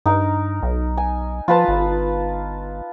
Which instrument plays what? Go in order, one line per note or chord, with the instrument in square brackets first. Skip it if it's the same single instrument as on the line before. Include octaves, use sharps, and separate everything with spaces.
[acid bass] G2 [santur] D#4 A#4
[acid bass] B1
[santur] G#5
[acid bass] F3 [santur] F4 B4 A5
[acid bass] G1